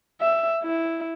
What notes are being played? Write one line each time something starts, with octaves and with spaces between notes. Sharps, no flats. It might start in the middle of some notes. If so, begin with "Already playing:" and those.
E5
E4